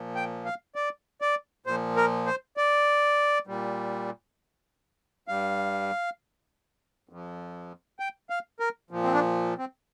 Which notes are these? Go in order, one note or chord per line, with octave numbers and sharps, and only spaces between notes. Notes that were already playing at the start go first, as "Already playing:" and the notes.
Already playing: A#2 F3
G5
F5
D5
D5
A#2 F3 C5
A#4
C5
D5
A#2 G3
G2 G3 F5
F2 F3
G5
F5
A#4
A#2 F3
C4
D4
C4